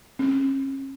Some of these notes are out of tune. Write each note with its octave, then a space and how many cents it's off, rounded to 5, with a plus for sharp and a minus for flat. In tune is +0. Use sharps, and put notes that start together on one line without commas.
C#4 -35